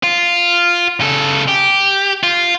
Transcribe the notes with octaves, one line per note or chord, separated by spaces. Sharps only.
F4
C#3 A4
G4
F4